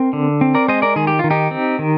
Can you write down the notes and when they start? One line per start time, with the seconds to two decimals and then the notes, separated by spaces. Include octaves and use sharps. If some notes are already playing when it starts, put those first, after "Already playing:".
Already playing: C4 A#4
0.13 D3
0.41 C4
0.55 A#4 D5
0.68 G#3 C5 D#5
0.82 A#4 D5
0.96 D#3 G#4
1.07 G4
1.19 D#3 F4
1.31 D#4 G4
1.51 C4
1.79 D#3